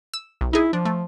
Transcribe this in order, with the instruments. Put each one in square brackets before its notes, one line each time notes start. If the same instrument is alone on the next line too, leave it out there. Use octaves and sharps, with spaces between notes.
[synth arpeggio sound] E6
B1
[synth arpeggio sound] D#4 G#4 [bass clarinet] E4
[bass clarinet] F3 [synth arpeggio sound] D4
[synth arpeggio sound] A3